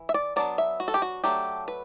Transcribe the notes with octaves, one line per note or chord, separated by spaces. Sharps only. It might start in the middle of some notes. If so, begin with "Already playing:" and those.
Already playing: E3
E5
D5
F#3 B3 D4 D5
E5
F#4
A4
G4
F#4
F#3 A3 D4 G4
B4